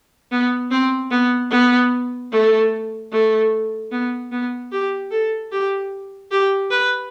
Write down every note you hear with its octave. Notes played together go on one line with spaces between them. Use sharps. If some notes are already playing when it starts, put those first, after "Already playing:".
B3
C4
B3
B3
A3
A3
B3
B3
G4
A4
G4
G4
B4